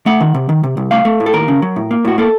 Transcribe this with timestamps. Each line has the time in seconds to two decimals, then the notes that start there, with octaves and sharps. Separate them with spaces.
0.06 A3 F#5
0.21 D#3
0.34 C3
0.49 D#3
0.64 C3
0.77 C2
0.91 A3 F5
1.05 A3
1.20 A2
1.26 A4
1.33 D#2 A#4
1.48 C#3
1.62 F#3
1.76 A2
1.91 A#3
2.05 A2 F#4
2.18 A#3 A4